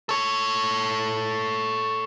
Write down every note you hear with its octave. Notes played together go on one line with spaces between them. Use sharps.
A4 C#5